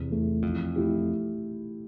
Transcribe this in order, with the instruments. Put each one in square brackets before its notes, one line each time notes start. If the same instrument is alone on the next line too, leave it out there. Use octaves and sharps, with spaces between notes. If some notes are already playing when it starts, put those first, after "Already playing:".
Already playing: [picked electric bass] E2 [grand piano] C3
[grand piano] E3 A3
[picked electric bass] F2 [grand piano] E3
[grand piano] A3 E4 G4